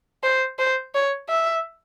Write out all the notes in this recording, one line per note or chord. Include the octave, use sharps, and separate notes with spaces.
C5
C5
C#5
E5